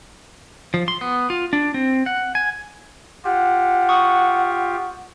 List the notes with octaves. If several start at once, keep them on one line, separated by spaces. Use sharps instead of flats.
F3
C6
B3
F4
D4
C4
F#5
G#5
F4 G4 F#5
C#6 D#6